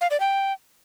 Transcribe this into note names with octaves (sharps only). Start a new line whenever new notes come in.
F5
D5
G5